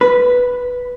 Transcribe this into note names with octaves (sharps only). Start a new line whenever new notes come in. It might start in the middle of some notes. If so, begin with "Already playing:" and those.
B4